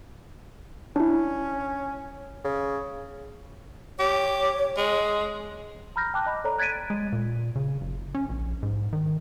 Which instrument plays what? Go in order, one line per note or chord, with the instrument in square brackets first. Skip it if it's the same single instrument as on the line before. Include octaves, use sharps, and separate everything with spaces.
[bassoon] C#4 [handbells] D4 E4
[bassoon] C#3
[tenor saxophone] G4 [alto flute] C#5
[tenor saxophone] G#3
[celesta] A#5 B5 F6 G6 A#6
G5 A5 D6 F#6
D#5 B5
A4 C#5 D5 A#5
F#6 G#6 A6 B6 D7 D#7
[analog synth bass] G#3
A#2
C#3
F#1
C#4
A#1
G#2
D#3